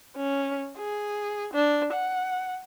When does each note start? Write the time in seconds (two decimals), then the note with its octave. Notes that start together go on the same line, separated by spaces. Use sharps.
0.16 C#4
0.77 G#4
1.54 D4
1.93 F#5